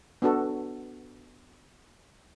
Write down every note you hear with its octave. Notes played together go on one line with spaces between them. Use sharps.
B3 D4 F#4 A4